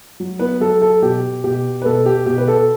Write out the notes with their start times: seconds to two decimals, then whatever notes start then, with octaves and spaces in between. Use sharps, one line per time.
0.20 F#3
0.39 B3 B4
0.60 F#3 A4
0.82 A4
1.02 B2 G4
1.44 B2 G4
1.82 B4
1.85 B2 A4
2.06 G4
2.26 B2 G4
2.38 B4
2.48 A4